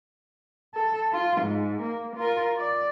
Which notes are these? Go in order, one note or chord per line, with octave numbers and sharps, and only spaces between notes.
A4
F4
G#2
A#3
F4 A#4
D5